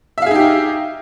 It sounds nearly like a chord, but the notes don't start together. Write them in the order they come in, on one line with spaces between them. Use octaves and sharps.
E5 F5 G#4 D#4 G4